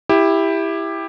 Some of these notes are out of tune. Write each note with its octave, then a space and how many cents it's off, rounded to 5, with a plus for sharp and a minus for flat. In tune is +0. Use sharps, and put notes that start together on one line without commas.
E4 +0 G4 +15